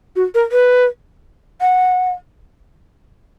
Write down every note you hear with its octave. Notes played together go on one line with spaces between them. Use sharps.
F#4
A#4
B4
F#5